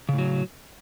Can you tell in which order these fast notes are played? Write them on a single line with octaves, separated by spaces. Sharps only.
C#3 A2 F#3